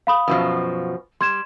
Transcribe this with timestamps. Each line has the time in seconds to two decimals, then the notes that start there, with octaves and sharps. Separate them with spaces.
0.07 F5 B5 D#6
0.28 F#2 B2 F3
1.21 G3 C6 G#6 E7